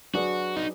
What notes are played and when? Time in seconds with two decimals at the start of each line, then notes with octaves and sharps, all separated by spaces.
0.14 F#3 D4 F#4 G#4 B4 D5
0.56 D#4